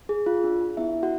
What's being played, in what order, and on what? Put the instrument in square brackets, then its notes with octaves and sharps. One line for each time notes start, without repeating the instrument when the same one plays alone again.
[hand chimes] G#4
F4
D4
D4
B3 E4 E5
B3
F#4 F#5